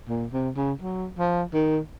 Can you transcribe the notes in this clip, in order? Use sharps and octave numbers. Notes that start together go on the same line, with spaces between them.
A#2
C3
C#3
F#3
F3
D#3